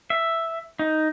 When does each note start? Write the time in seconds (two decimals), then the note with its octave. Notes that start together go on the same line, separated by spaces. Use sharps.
0.10 E5
0.79 D#4